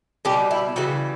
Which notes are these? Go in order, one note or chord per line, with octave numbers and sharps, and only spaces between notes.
B2 G3 G4
E4
C#3 E3 G3 F#4